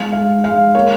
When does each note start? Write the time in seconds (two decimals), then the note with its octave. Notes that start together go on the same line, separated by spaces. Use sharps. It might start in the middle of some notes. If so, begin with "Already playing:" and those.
Already playing: G#3 F5
0.13 G#3 F5
0.44 G#3 F5
0.75 A#3 C#5